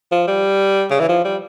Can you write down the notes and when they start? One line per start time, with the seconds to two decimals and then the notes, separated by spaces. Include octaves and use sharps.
0.12 F3
0.27 G3
0.91 C#3
1.00 E3
1.09 F3
1.25 G3